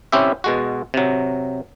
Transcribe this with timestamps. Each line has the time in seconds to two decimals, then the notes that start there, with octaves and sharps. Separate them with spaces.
0.12 C4 C#4 E4 G4 E5
0.44 B2 G#3 F#4
0.94 C3 F#3